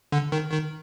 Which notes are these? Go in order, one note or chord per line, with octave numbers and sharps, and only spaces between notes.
D3
D#3
D#3